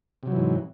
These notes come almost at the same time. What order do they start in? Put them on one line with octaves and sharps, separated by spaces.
C3 F#3 E3 G#2